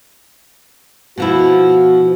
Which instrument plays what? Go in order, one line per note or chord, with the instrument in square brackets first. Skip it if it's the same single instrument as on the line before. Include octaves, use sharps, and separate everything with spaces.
[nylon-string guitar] B2 F3 E4 [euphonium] F#4